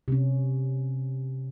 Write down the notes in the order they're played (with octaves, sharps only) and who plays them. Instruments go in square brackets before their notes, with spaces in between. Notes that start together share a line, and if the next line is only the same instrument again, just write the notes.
[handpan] C3 C#4